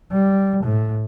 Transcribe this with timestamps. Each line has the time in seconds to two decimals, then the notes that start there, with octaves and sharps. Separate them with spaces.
0.12 G3
0.63 A2